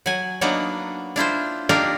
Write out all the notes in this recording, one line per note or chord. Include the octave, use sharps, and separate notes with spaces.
F#3 G#5
F#3 A#3 B3 D4 D#4
D4 E4 F4 C5
A#3 D4 D#4 F4 G4 A#4